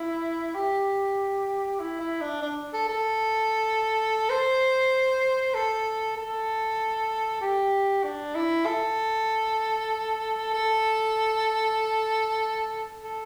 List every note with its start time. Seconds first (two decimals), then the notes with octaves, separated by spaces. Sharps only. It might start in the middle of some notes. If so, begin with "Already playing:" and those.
Already playing: E4
0.55 G4
1.80 E4
2.00 E4
2.21 D4
2.42 D4
2.73 A4
2.89 A4
4.29 C5
5.54 A4
6.17 A4
7.41 G4
8.03 D4
8.35 E4
8.66 A4
10.53 A4
13.04 A4